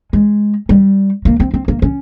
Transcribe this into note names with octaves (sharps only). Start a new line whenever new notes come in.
G#3
G3
A#3
C4
C4
A#3
C#4